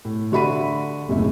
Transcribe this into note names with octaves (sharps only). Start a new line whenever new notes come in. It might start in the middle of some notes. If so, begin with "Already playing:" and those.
A2
D3 F#4 E5 B5 B6 D#7
F#1 D#2 A2 C#3 E5